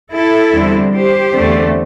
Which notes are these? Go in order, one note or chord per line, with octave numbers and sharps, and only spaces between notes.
E4 A4
E2 D3 G3 C4
G4 C5
E2 D3 A3 C4